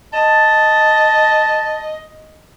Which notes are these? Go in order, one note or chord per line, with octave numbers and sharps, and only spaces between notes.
D#5 A5